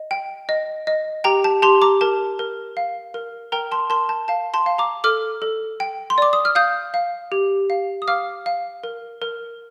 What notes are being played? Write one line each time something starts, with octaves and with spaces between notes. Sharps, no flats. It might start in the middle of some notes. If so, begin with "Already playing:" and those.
Already playing: D#5
G5
D#5
D#5
G4 G5 A#5
A5
G4 A5 C6
A#5 D6
A#4 A5
A#4
F5
A#4
A#4 G5 A#5
A5 C6
A#4 A5 C6
A5
F5 A5
A5 C6
F5
A#5 D6
A4 D6 F6
A4
G5
C6
D5 D6
D#6
F6
F5 D#6 G6
F5
G4
F5
D#6
F5 D6 F6
F5
A#4
A#4